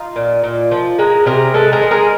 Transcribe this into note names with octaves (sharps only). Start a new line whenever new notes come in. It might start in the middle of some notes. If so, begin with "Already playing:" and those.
Already playing: D#4 F4
A#2
A#2
F3
G#3 G#4 A#4
C3 G#4 A#4
G#3 A4 B4
G#4 A#4
G#3
G#4 A#4